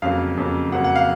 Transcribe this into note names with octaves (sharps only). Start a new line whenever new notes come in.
F2 C#3 F#3 A#3 F5
F2 C#3 F#3 A#3
F2 C#3 F#3 A#3 F#5
F#5
F5